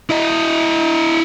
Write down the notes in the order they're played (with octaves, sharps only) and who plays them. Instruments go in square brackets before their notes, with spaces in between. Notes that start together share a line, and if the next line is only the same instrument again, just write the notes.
[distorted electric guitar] E4 D#5